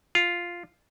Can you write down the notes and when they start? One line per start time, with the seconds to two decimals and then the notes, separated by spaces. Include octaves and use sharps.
0.15 F4